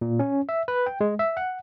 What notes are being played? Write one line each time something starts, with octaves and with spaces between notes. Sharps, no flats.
A#2
C#4
E5
B4
G5
G#3
E5
F#5